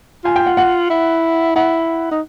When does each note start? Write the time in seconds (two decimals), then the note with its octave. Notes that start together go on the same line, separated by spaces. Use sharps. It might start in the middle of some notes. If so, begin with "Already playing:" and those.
0.25 F4 G#5
0.36 G5
0.46 F#5
0.57 F#5
0.90 E4
1.56 E4 F#5
2.12 D#4